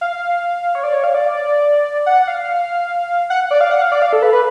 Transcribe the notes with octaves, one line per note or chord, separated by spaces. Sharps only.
F5
C#5
D5
C#5
F5
D5
F#5
F5
F#5
D5
F5
F#5
F5
D5
F5
A4
B4
B4